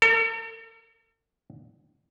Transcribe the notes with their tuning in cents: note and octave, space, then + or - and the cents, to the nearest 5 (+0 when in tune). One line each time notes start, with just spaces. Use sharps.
A4 +45